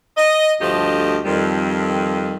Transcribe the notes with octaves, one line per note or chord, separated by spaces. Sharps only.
D#5
D2 G2 F3 A3 G4 D#5
F2 D#3 G3